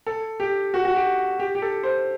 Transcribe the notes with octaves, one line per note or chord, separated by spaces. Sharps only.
A4
G4
F#4
F#4
G4
G4
G4
A4
C5